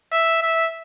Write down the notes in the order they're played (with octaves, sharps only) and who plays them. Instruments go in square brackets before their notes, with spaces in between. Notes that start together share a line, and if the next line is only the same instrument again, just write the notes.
[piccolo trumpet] E5
E5